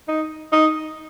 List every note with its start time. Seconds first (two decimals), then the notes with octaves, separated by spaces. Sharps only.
0.08 D#4
0.52 D#4